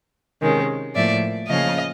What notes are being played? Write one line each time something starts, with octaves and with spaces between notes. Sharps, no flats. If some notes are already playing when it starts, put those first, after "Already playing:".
C3 D#3 G#3 C#4
A2 F3 A#3 D5 E5
C#3 F3 A#3 C#4 D#5 F5